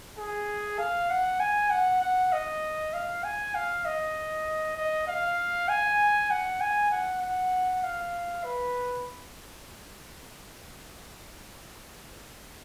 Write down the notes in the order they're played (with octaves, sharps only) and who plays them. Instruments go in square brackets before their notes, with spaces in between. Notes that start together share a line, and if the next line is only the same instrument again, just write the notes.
[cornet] G#4
F5
F#5
G#5
F#5
F#5
D#5
F5
G#5
F5
D#5
D#5
F5
G#5
F#5
G#5
F#5
F#5
F5
B4